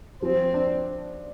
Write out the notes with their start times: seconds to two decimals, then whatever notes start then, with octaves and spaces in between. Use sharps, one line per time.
0.22 F3 C4
0.54 D4